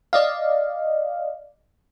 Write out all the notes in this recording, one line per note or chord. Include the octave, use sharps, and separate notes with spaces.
D5 D#5 F5